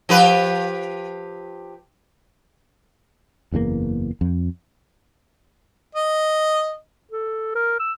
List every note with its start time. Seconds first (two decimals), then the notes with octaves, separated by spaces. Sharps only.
0.09 F3 G4 B4
3.52 F#1 E2 C#3 A#3
4.21 F2
5.95 D#5
7.12 A4
7.55 A#4
7.80 E6